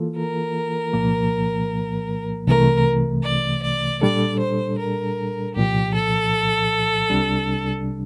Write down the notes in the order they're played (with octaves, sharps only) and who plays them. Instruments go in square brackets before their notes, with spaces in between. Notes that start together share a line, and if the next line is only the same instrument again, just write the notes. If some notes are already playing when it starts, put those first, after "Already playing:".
Already playing: [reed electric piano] E3 A#3 F4 A4
[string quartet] A#4
[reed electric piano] C2 A#2 F3 A#3
[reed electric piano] C2 C3 E3 A3 [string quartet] A#4
[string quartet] D5
D5
[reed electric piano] A#2 G3 D4 A4 [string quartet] D5
[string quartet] C5
A#4
[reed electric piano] C2 A#2 F3 [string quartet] G4
[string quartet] A4
[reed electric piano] C2 C3 G3 D4